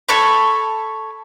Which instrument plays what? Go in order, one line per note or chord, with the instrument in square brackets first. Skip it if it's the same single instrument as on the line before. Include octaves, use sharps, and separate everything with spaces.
[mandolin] A4 C#5 B5